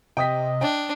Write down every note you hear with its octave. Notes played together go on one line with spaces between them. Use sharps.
C3 D#5 G5 D#6 B6
D4 G5